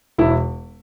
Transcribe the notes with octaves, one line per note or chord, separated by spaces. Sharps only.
E1 E4